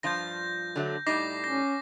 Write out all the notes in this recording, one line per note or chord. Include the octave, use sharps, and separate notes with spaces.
G2 F3 F4 G6 A#6
D3 F#3 A3
A2 G3 D#4 D6 A#6 C7
C#4 A#6